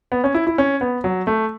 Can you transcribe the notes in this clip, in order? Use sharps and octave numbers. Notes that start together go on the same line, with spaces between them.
B3
C#4
E4
E4
C#4
B3
F#3
A3